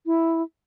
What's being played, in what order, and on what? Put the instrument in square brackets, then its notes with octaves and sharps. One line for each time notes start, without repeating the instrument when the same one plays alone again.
[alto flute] E4